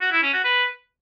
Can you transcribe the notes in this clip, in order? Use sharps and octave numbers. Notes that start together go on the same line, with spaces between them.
F#4
E4
C#4
F#4
B4